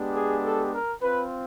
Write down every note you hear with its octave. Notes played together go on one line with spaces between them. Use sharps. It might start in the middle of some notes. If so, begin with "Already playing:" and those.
Already playing: G#3 B3 D4 G4
G#4
A4
A#4
C4 F4 B4